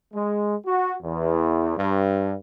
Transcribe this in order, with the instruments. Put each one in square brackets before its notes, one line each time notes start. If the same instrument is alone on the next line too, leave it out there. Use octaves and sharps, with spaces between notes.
[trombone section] G#3
F#4
E2
G2